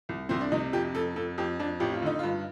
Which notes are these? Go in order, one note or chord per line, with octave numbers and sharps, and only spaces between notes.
C2
C2 C4
D4
C3 D#4
F2 G4
F2 A4
F2 A4
F2 G4
F2 D4
A1 G4
F4
D3 D#4
F4
G2